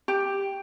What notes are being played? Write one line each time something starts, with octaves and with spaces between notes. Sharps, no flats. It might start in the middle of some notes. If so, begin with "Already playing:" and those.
G4